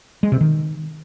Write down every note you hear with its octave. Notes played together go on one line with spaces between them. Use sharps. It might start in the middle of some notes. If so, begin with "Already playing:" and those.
G#3
C3
D#3